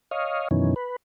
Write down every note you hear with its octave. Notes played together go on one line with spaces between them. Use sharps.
C#5 D#5 F5
F#2 B2 D#3 E3 C#4
B4